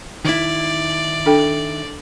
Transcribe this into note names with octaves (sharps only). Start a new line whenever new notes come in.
D#3 E4 D5
D4 A4 G5